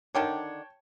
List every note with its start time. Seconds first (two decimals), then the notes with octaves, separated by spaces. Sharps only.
0.15 D3 D#3 D4 C#5 G5 A5